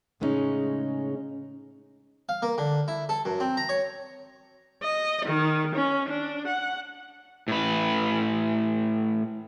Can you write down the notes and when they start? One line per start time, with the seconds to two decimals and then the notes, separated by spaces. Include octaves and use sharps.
0.20 A2 C#3 G#3 B3 C#4 D#4
2.29 F5
2.42 A#3
2.58 D3
2.88 E4
3.09 A4
3.25 F#2
3.40 C4
3.57 A#5
3.69 C#5
4.83 D#5
5.25 D#3
5.75 C#4
6.09 D4
6.48 F#5
7.48 A2 B4